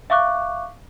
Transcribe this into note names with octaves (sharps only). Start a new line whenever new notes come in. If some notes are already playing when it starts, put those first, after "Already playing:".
E5 F5 C#6 D6 F#6